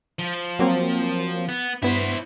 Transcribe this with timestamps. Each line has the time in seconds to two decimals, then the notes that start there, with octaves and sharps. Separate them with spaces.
0.19 F3
0.59 F#3 A#3 C4
1.49 B3
1.82 G2 B3 E4 C5 B6